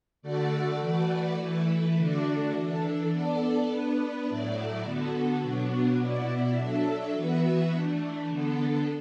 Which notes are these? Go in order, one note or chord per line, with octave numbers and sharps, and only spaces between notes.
D3 A3 F#4 A4 D5
E3 A3 F#4 B4 D5
E3 A3 E4 B4
D3 A3 D4 F#4 D5
E3 D4 A4
B3 D4 A4 D5
B3 D4 B4
A2 F#3 A3 E4 D5
D3 B3 F#4 A4
B2 F#3 B3 D4 F#4
B2 B3 E4 D5
F#3 D4 A4 E5
E3 B3 F#4 B4 E5
E3 A3 D4
D3 B3 D4 A4